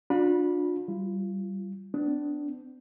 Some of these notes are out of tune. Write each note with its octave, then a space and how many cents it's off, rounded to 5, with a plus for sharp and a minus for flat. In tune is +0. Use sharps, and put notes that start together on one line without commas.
D4 +5 F4 +45 B5 -15
G3 -20 F4 -25
B3 +45 D4 -5